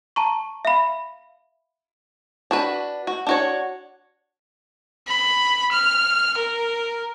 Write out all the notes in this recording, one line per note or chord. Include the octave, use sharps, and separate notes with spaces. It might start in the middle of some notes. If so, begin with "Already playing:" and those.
A5 A#5 C#6
E5 F5 B5
D4 F#4 B4
F#4
D4 F#4 C#5
B5
F6
A#4